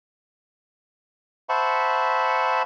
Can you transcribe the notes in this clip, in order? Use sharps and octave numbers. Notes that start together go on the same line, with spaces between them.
C5 E5 F#5 A5 B5 C#6